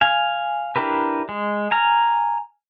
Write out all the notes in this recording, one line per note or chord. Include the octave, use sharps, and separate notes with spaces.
F5 G#5
D4 E4 G4 A#4 B4
G#3
G#5 A#5 F6